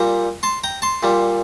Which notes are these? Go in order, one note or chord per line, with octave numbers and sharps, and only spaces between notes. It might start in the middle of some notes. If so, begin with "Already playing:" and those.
Already playing: A#2 G3 G5 A#5
A5 C6
G5 A#5
A5 C6
A#2 G3